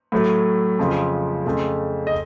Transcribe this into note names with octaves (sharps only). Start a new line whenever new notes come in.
A2 F#3 A3
F2 C#3 F3
F2 C#3 A3
D#5